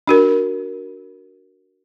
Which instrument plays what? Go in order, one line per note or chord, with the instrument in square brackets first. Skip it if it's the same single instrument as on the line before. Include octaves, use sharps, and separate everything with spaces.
[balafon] D4 F#4 A#4